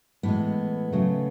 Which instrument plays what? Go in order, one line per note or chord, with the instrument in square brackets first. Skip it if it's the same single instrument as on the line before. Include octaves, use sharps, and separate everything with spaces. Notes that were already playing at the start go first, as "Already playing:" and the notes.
[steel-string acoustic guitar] A2 E3 G#3 B3
C#3 F#3 A3